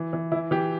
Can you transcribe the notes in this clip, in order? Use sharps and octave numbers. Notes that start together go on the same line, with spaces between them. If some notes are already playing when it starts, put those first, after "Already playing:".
Already playing: E3
E3
E3 E4
E3 G4